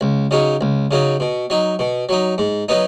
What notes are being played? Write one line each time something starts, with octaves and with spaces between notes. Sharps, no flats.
C#2
C#3 F#3 D#4
C#2
C#3 F#3 D#4
B2
F#3 D#4
B2
F#3 D#4
G#2
F#3 B3 D#4